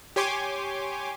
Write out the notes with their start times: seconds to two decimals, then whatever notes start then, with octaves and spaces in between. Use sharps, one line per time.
0.16 G4 C#5 G#5 C6 D6